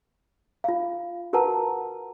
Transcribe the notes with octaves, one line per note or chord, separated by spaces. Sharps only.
F4 F5
F#4 A#4 B4 F#5 A5 A#5